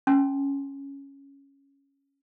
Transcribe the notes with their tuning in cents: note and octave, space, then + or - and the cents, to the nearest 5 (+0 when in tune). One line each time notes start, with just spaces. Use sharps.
C#4 +0 G#5 +30 C6 +0